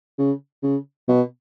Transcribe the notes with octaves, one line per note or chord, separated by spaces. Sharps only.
C#3
C#3
B2